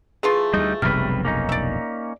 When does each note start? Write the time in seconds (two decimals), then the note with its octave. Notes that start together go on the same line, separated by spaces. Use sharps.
0.23 E3 A3 F4 G#4
0.54 D2 G3 D#4
0.82 F1 B1 G2 C3 G3 B4 F6
1.25 A#3 C#4 D#4
1.49 D5 E5